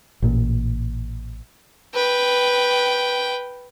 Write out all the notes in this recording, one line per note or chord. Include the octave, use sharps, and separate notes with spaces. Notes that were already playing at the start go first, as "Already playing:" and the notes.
A1 A#2
B4 G5